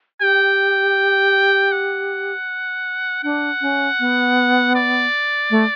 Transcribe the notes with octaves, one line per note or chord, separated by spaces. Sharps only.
G4 G5
F#5
D4 F#5
C#4
B3
D5
A3